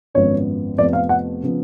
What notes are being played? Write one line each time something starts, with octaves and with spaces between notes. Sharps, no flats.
G#1 F#2 F3 B3 C#5
F1 F2 F3 B3 D5
F5
F#5
C#3 F3 B3